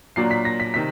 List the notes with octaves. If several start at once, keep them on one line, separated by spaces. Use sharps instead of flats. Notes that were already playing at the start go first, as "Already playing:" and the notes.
A#2 F#3 A#3 D4 C7
B6
A#6
B6
C3 D#3 B6